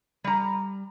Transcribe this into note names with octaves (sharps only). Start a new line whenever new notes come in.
G3 A#5